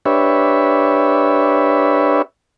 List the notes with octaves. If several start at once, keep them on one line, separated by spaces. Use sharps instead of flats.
D4 G4 B4 C#5 E5